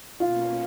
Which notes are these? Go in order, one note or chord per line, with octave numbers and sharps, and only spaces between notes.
B2 A#3 C#4 F4